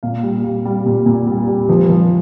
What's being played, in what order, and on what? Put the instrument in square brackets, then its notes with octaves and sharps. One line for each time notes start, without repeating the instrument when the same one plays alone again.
[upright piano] A#2 F5
G3
G3
G3
A#2
A#2
G3
G3
F3
F3